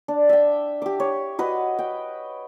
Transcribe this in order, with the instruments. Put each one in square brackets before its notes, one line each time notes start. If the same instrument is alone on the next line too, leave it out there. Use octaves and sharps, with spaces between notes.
[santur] D4
E5 G5
G4 D6
C#5
F#4 B4 D#5
G5